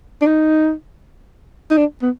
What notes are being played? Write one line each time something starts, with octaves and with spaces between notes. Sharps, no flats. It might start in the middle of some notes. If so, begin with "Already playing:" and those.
D4
D#4
D#4
D4
B3